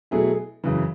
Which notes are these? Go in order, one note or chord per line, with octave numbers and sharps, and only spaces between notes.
B2 F#3 A3 E4 G#4
F#2 C#3 E3